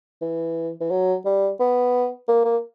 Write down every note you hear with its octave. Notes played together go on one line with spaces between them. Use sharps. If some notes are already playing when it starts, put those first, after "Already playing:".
E3
E3
F#3
G3
B3
A#3
A#3